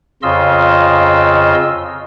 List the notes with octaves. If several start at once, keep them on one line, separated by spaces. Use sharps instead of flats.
F2 C#3 F4 D#5 C6 E6